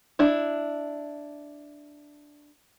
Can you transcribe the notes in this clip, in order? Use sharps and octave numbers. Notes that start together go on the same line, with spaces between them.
D4 E4